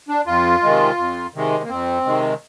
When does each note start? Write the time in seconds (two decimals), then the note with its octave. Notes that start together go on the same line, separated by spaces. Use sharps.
0.09 D4
0.27 F2 F4
0.62 C3 D#3 G#3
0.98 F2
1.34 C3 D#3 G#3
1.64 A#3
1.69 F2 C4
2.05 C3 D#3 G#3